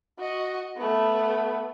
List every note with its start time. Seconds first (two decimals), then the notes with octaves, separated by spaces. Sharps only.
0.19 F#4 D#5
0.77 A3 B3